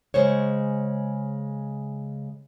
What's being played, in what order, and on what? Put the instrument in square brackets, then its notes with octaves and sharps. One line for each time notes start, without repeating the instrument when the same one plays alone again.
[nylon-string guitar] C#3 G#3 C5 C#5